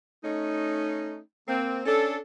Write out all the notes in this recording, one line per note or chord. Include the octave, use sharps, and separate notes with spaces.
A3 C#4 D#4
A#3 C4
C#4 D4 A4